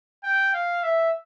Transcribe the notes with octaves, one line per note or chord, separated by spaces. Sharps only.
G5
F5
E5